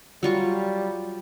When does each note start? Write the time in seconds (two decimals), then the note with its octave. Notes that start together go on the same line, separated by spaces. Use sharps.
0.23 F#3 G3 F4 C#6